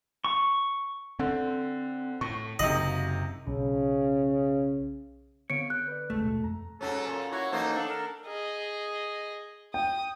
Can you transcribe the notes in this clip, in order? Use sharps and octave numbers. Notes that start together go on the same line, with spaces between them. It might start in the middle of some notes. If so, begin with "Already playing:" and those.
C#6
D3 C4
A2 C#6
F#1 C3 D#4 D#5 F#7
B1 C#3
D3 B3 C4 C#5 F5 C#7 D7
F#6 G6
B4 D5
A1 D#2 G#3 A3
B2
F2 A#5
G#2 F#3 C#4 A4
A#2
A#3 E4 F#4 C#5
E3 F#3 A#3 D#4 A4 C5
D4 A4
A#4
G#4 D#5
G5 D#6